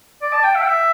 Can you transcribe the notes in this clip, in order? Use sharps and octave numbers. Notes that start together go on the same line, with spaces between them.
D5
A5
G5
E5
G5
E5